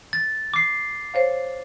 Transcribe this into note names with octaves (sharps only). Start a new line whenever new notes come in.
A6
D6 C7
C5 C#5 F5